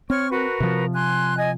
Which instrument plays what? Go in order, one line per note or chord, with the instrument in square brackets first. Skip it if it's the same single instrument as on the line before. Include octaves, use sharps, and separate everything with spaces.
[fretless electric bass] C4 [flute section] C#5 C#6 F6
[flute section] F#4 A#4 B4
[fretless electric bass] C3 F3
[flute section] G#5 C6 F#6
D#5 G#5